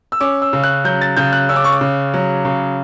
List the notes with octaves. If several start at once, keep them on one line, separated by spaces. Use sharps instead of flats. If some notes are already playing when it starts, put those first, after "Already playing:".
E6
C#4 D6
E6
C#3
F#6
F#3 G6
A6
C#3 G6
F#6
C#4 E6
D6
C#6
D6
C#3
F#3
C#3